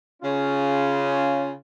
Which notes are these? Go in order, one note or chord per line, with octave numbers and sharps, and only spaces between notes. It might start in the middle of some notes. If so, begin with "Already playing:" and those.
C#3 C#4 F4